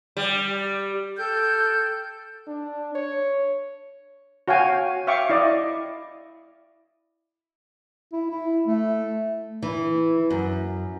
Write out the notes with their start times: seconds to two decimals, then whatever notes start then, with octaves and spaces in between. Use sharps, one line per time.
0.17 G3
1.17 A4 G5 F6 G6
2.47 D4
2.95 C#5
4.48 F#4 C#5 F5 G5 G#5
5.07 E5 F5 G5 C#6 D6
5.30 E4 D5 D#5
8.13 E4
8.30 E4
8.67 A3
9.62 E3
10.30 F#2